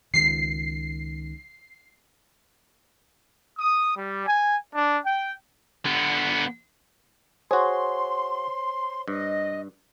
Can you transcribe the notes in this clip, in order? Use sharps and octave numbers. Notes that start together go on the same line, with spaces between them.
C#2 D#3 C7
D#6
G3
G#5
D4
G5
D3 B3
F#4 G#4 C5 C#5 C6
G2 D#5